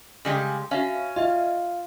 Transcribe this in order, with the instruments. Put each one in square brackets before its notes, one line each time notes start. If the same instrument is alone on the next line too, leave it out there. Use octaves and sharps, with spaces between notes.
[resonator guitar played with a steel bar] C#3 G3 G#3
[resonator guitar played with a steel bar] C#4 [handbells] F#4 E5 F5
[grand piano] F4 [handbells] D#5 E5